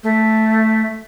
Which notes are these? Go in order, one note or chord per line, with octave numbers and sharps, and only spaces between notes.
A3